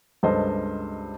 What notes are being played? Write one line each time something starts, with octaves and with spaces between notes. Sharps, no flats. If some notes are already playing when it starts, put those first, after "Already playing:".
C#2 G2 A4 B4 C5 D#5